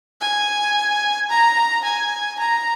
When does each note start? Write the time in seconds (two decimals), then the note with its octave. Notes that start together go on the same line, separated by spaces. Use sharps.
0.21 G#5
1.30 A#5
1.84 G#5
2.40 A#5